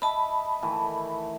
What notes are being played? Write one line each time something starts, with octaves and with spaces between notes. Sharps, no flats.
D#5 E5 A5 B5
D#3 E3 A3